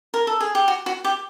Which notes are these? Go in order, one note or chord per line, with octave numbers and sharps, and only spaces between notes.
A#4
A4
G#4
G4
F#4
F#4
G4